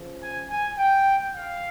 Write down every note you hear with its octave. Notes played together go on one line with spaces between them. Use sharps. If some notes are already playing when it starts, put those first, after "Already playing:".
Already playing: C#3 F3
G#5
G#5
G5
F5